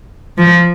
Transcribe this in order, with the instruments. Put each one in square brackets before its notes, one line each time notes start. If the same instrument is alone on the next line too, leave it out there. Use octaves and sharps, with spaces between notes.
[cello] F3